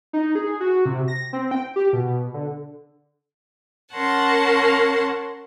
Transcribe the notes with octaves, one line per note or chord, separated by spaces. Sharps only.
D#4
G#4
F#4
C3
A#6
C4
G5
G4
B2
D3
C#4 A#4 C#5 F#5 A5 C6